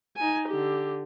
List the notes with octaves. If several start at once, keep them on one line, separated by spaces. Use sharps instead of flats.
D#4 G#5
D3 G4